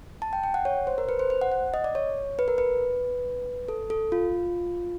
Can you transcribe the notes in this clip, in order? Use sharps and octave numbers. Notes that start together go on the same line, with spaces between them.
A5
G5
G5
F#5
C#5
C5
A#4
B4
C5
C5
F#5
F#5
D#5
D5
C#5
B4
A#4
B4
A4
A4
F4